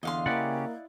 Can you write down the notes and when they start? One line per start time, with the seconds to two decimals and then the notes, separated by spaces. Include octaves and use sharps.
0.03 E2 D3 D#5 F5 C6
0.26 C#3 A#3 C#4 E4 G4 D5 F#5